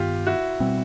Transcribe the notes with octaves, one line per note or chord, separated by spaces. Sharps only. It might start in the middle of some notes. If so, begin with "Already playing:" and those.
Already playing: G2 D#3 B3 F4 G4
E4 F#4
B2 G3 C4